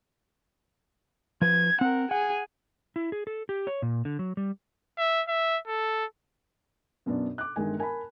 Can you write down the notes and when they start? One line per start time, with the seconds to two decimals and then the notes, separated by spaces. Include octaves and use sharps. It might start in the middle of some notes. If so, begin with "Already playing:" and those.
1.42 F3 B4 G#6
1.81 C4 A#4 F#5
2.11 G#4 F#5 G#5
2.96 E4
3.12 G#4
3.27 A4
3.49 G4
3.67 C#5
3.82 A#2
4.05 D3
4.19 F#3
4.37 G3
4.98 E5
5.28 E5
5.67 A4
7.06 F#2 B2 B3 D4
7.38 D6 F#6
7.56 G1 D#3 G#3 G#5
7.78 A#4 G#5 A5 B5